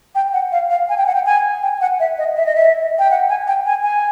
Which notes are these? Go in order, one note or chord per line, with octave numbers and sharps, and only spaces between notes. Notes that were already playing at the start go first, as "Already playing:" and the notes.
G5
F#5
F5
F5
G#5
G5
F#5
G5
G#5
G5
F#5
E5
D#5
E5
D#5
E5
G5
F#5
G#5
G5
G#5
G#5